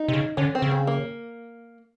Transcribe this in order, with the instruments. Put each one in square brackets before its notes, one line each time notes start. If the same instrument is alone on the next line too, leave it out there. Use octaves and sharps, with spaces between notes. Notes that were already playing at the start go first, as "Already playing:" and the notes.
Already playing: [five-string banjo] D#4
[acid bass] C3
C#3
[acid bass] D3 [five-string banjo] C#4
[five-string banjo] C4
[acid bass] C#3
[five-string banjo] C4
A#3